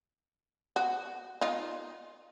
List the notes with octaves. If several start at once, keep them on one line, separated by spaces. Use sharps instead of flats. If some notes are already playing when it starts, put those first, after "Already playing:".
F#4
D#4 F4